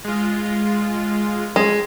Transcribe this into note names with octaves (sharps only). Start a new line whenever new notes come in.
G#3 F4
G#3